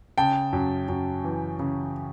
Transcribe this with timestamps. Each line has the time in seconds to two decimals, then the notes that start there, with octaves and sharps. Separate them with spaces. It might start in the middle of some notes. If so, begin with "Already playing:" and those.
0.18 C#3 G5 A5
0.53 F#2
0.88 F#2
1.24 E3
1.59 C#3